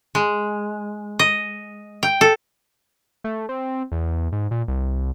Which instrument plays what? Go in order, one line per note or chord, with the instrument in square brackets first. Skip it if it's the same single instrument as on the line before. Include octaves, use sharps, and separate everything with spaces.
[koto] G#3
D#5
G5
A4
[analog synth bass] A3
C4
E2
G#2
A#2
C2